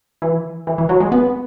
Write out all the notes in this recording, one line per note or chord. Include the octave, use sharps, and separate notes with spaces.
E3
E3
E3
F#3
G#3
B3